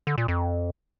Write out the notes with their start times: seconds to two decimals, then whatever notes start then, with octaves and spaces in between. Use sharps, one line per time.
0.07 D3
0.18 A#2
0.28 F2